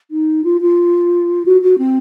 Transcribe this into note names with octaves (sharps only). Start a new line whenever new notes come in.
D#4
F4
F4
F#4
F#4
C4